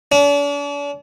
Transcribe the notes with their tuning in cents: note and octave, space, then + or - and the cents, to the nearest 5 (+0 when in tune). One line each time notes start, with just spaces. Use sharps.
D4 -45